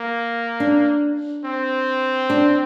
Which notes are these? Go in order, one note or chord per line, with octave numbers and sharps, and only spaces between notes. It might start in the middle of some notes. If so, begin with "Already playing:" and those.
Already playing: A#3
D4
C4
D4